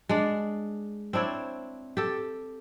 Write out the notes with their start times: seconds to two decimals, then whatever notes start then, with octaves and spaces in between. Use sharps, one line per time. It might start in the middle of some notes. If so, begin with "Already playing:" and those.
0.09 G#3 D4
1.13 C4 D4 E4 C#5
1.97 G4 A4